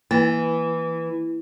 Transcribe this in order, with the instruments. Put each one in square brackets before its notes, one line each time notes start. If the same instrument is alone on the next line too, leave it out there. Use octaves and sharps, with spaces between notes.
[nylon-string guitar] E3 [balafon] A#3